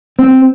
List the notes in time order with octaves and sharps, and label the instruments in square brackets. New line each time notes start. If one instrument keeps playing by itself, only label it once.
[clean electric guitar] C4